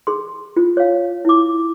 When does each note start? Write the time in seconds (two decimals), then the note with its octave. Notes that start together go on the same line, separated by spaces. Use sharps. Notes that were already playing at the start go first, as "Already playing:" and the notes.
0.07 G#4 C6
0.56 F4
0.77 C#5 F5
1.25 E4 D6